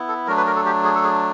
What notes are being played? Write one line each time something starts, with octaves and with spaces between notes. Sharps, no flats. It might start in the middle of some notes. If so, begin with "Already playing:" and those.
Already playing: B3 E4
A4
F#3 A3 D4 A#4
B4
A#4
A4
G4
G#4
A4
G#4